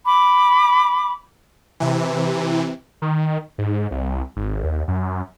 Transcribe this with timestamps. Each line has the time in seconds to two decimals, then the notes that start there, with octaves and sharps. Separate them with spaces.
0.06 B5 D6
1.80 C3 E3
3.02 D#3
3.58 G#2
3.91 C2
4.36 G#1
4.64 D#2
4.88 F#2